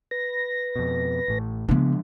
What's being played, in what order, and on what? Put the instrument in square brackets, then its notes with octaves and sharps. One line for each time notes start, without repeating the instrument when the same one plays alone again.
[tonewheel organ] B4 A#6
[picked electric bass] F2 B2
A1 A2
[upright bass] C#3 B3 [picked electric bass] F3 G#3 D4